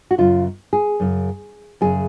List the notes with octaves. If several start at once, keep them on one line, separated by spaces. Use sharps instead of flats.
F#4
F#2 C#3 F4
G#4
F#2 C#3
F#2 C#3 G#4